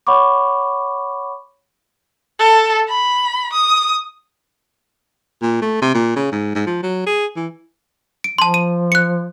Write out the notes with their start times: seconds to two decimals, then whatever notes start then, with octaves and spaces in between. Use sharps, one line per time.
0.07 C#5 F#5 B5 C#6 D6
2.40 A4
2.89 B5
3.53 D#6
5.42 A#2
5.62 A3
5.82 C3
5.94 A#2
6.16 C#3
6.32 G#2
6.55 G#2
6.66 F3
6.83 F#3
7.07 G#4
7.36 E3
8.24 D7
8.38 F3 A5 C6
8.54 D#7
8.92 F#6 C#7